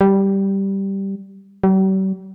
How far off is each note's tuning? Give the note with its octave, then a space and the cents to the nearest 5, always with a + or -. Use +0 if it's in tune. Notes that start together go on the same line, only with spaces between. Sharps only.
G3 -5
G3 -45